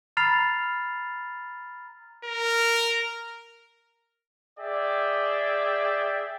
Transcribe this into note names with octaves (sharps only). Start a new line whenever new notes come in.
A#5 B5 F6 A6 C7 F7
A#4
G#4 D5 E5 G5